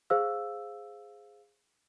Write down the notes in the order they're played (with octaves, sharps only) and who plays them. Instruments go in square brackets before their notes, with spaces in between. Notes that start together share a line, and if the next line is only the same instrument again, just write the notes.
[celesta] G#4 C5 F5 E6